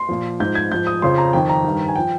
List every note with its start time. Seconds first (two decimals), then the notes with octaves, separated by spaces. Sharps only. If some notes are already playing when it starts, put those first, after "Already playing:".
Already playing: C6
0.09 A#2 F3
0.40 G#2 F3 G6
0.55 G#6
0.71 G#2 F3 G6
0.87 D#6
1.02 F2 C#3 F3 C6
1.18 A#5
1.33 F2 D#3 G5
1.49 A#5
1.64 G2 D#3
1.89 G#5
1.96 F3 G5